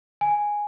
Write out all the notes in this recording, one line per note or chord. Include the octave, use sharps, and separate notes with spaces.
G#5